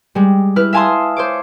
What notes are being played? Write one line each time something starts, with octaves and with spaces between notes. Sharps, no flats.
G3 G#3
E4 B4 F6
E5 F5 G#5 A5 C6 D#6
C5 C#5 D6